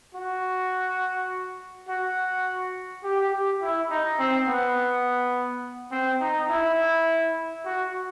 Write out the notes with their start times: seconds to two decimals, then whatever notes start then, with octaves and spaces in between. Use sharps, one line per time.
0.15 F#4
1.88 F#4
3.03 G4
3.32 G4
3.61 E4
3.90 D#4
4.19 C4
4.47 B3
5.91 C4
6.20 D#4
6.49 E4
7.65 F#4